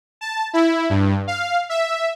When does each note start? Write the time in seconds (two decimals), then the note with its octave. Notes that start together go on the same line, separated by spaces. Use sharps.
0.21 A5
0.54 E4
0.90 G2
1.27 F5
1.69 E5